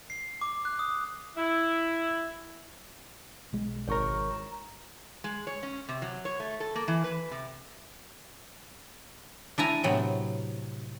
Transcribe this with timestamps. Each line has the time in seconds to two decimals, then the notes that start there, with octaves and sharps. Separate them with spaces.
0.10 C7
0.41 D6
0.65 F#6
0.79 D#6
1.37 E4
3.53 B1 G#3
3.88 G#1 A#4 C#5 C#6
4.31 A#5
5.24 G#3
5.47 C#5
5.63 C#4
5.89 C3
6.02 F#3
6.25 C#5
6.40 A3
6.60 A4
6.76 A#3
6.88 E3
7.04 B4
7.31 C3
9.58 D4 E4 G#5 A#5
9.84 A2 C3 F#3 B3